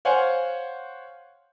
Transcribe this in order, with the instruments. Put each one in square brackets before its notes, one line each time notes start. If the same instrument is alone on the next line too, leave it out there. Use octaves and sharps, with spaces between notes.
[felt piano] C5 C#5 F5 F#5 G#5